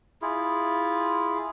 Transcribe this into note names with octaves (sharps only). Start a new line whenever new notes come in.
E4 F4 G#4